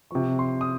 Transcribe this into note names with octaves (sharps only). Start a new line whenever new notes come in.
C3 F3 C#6
C6
D#6